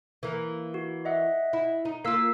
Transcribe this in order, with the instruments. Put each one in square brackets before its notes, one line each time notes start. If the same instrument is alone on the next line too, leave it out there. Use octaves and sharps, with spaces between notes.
[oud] E3 A#3
[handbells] F#4
D#5 E5 F#5
[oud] E4
D#4
[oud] A#3 F4 [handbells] E6 B6 C7